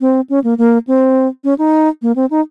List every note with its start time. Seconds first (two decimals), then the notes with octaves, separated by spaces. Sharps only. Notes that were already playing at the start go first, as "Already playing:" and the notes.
0.01 C4
0.30 C#4
0.44 A#3
0.58 A#3
0.87 C4
1.44 C#4
1.58 D#4
2.02 A#3
2.16 C4
2.31 D#4